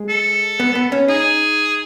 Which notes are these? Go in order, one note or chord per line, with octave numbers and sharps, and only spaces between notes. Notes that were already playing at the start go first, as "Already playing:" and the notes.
Already playing: G#3
A4
B3
B3
C#4
D#4 G#4